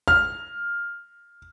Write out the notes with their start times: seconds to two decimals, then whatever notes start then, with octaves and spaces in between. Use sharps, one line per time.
0.08 F6